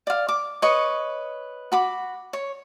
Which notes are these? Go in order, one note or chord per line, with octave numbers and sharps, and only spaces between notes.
D5 F5
D6
B4 C#5 D#5 C#6
F#4 B5 D6
C#5